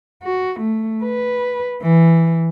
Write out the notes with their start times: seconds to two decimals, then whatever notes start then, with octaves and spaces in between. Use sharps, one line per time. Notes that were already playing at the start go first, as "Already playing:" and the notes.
0.23 F#4
0.60 A3
1.04 B4
1.82 E3